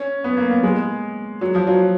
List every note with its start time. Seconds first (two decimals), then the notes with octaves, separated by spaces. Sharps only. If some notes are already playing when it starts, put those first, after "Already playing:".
Already playing: C#4
0.24 B3
0.37 A#3
0.50 B3
0.63 G#3
1.41 F#3
1.55 F3
1.67 F#3